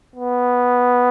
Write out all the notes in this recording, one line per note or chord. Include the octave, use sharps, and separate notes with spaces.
B3